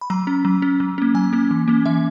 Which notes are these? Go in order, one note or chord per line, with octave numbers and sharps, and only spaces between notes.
B5
F#3 A#5
C#4
F#3
C#4
F#3
A#3 C#4
F#3 G#5
A#3 C#4
E3
A#3 C#4
E3 E5